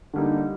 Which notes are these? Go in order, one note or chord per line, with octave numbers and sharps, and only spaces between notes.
D3 G3 A#3 D#4